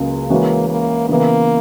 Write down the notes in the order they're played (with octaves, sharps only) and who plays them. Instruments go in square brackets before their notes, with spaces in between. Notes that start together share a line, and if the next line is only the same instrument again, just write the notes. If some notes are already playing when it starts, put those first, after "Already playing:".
Already playing: [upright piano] C#2 C#3 F#3 A#3
[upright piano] E3 G#3 C#4 F#4 B4 [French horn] A#3
[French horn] A#3
[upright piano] C#3 E3 B3 [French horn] A#3